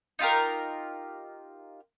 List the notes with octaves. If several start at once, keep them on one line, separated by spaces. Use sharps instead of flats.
D#4 F4 G4 A#4